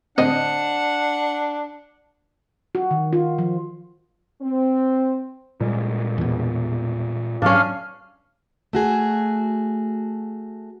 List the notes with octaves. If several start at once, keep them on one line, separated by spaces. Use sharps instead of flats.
A2 D3 C4 D4 C5 D#5 F#5
F#4
D#3
F4
F3
C4
A#2 G3 G#3
E2 B2
G#2 F#3 C#4 D4 F5 F6
A3 F#4 G#4